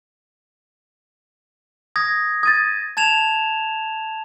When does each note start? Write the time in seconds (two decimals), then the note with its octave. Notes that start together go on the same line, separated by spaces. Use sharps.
1.96 D#6 G#6 A#6
2.43 D#6 G#6 A6 D#7
2.97 A5 G#6 E7 F7